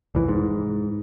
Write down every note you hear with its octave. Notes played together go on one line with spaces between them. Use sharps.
F1 C2 E3
G#2